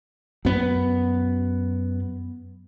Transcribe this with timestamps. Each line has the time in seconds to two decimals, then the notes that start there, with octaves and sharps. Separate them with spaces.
0.45 F#2 B3